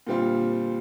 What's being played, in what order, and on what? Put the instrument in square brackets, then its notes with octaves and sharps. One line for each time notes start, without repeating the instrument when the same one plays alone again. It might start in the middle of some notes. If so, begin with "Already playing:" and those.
[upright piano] A#2 D3 G3 C4 F4